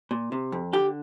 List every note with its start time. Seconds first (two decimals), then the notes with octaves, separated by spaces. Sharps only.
0.11 A#2
0.32 C3
0.52 F2
0.73 D3 G4